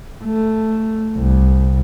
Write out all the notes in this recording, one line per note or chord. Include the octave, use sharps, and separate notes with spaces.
A3
C2